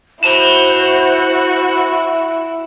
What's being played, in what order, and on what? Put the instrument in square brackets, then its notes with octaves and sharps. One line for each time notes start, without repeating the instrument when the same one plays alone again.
[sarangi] E4 [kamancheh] F#4 [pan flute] C5 [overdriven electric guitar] A5 B5